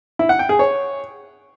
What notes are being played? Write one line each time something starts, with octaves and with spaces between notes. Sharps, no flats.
E4
F#5
G5
G#4
C#5